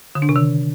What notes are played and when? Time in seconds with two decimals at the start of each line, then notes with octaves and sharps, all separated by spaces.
0.15 D3
0.22 D4
0.29 C3
0.36 D#3